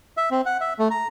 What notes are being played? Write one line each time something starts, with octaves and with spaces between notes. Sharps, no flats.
E5
C4
F#5
E5
A3
A#5